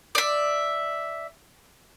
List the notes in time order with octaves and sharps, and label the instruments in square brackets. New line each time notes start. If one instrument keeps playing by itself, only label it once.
[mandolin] D5 E5